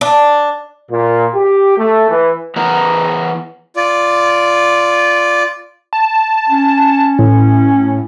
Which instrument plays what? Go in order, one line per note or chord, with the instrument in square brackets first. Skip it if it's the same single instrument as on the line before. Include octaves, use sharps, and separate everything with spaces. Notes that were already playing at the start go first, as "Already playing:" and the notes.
[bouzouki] D4
[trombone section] A#2
G4
A3
E3
[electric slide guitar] E3 B3 A#4
[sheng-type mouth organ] F4 D5
[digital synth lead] A5
[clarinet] C#4
[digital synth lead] A2